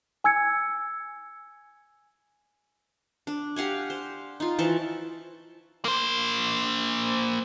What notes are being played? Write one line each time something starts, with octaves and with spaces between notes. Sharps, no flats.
G#5 E6 G#6 C#7
D4
G4 F5 F#5 G#5
C5
D#4 F4
E3 F3 A5 C#6
A#3 C5